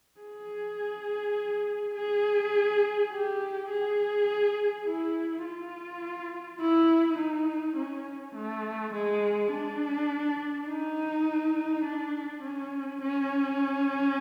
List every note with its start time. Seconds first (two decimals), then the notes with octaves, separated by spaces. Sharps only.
0.20 G#4
1.95 G#4
3.11 G4
3.70 G#4
4.86 E4
5.44 F4
6.61 E4
7.18 D#4
7.76 C#4
8.35 A3
8.94 G#3
9.52 D4
10.68 D#4
11.85 D4
12.42 C#4
13.02 C#4